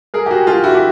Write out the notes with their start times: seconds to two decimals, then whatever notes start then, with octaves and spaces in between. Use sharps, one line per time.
0.14 G#4 A#4
0.26 G4
0.31 F#4 G#4
0.47 F4 G4
0.64 E4 F#4
0.75 G4